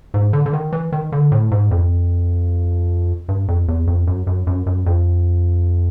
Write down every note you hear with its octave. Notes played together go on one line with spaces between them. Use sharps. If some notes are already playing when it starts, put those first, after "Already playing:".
G#2
D3
D3
D#3
E3
D#3
D3
A2
G#2
F2
G2
F2
E2
F2
F#2
F#2
F#2
F#2
F2